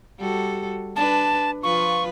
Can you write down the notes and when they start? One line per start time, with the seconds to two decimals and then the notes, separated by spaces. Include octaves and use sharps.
0.19 G3 F#4 A4
0.96 D4 B4 A5
1.63 F3 F4 B4 C#6